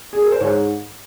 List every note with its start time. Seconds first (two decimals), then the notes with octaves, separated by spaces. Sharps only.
0.13 G#4
0.22 A#4
0.32 C5
0.41 G#2 C#5